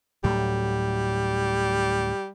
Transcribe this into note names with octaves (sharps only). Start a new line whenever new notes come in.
D2 A2 F#3 G3